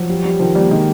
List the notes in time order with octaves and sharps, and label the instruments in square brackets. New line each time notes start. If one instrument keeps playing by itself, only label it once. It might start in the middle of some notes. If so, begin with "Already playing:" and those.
Already playing: [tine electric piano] F3 [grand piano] F#3
[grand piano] G3
G3
[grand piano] D#3 [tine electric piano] F3
[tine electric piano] G3 [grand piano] A#3
[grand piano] D#3 [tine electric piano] G#3